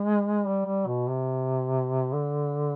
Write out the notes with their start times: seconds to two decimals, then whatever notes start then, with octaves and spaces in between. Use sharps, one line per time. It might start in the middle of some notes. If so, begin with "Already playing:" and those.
Already playing: G#3
0.46 G3
0.66 G3
0.87 B2
1.09 C3
2.13 D3